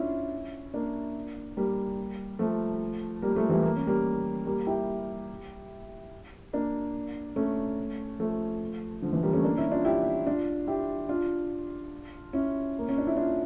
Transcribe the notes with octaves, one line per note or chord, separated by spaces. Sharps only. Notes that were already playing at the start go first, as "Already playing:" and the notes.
Already playing: C#4 D4 E4 F4
A#3 D4
G3 A#3
F3 A3
G3 A#3
F3 A3
E3 G3
A#3
C#4
G3 A#3
G3 A#3
E4 G4
A#3 D4
A3 C#4
F3 A3
D3 F3
E3
G3 A#3
A3 C#4
A#3 D4
C#4 E4
D4 F4
E4 G4
D4 F4
E4 G4
D4 F4
C#4 E4
A#3
C#4
D4
E4
D4 F4